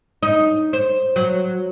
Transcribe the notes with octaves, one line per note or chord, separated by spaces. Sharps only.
D#4
C5
F#3